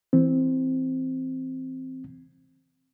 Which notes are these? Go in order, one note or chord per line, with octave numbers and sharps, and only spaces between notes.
E3 C4